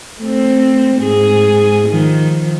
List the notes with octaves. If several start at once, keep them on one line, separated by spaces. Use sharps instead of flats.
A3 C4
G#2 G#4
D#3 F3